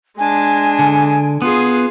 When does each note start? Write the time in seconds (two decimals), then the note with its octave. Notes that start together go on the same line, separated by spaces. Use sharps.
0.18 G#3 D4 G#5
0.79 D3
1.42 B3 F4 G#4